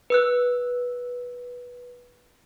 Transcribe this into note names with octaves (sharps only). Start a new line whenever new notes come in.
B4 E6 F#6